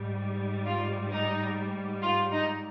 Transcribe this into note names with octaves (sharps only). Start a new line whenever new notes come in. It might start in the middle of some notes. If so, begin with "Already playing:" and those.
Already playing: G#2 G3
F4
D#4
F4
D#4